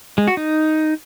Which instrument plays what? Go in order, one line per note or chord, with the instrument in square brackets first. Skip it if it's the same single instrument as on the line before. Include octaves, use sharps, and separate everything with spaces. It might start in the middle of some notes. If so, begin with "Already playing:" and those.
[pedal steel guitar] G#3
F#4
D#4